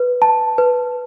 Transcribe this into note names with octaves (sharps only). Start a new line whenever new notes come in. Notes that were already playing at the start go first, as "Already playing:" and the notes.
Already playing: B4
A5
B4